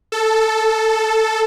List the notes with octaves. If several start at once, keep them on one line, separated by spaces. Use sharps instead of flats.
A4